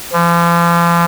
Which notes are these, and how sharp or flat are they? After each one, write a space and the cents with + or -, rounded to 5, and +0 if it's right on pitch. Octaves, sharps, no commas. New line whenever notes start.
F3 -40